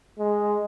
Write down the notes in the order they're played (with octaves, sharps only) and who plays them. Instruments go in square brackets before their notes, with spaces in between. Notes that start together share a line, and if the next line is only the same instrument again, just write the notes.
[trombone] G#3